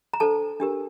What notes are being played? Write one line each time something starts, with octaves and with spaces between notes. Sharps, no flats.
A#5
D4 A4 C5 A5
D4 G4 A#4